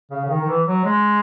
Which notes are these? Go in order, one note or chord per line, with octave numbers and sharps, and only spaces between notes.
C#3
C#3
D#3
D#3
E3
F#3
G#3